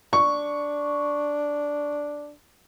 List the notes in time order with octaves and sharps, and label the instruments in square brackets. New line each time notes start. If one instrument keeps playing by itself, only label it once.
[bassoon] D4 [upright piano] C#6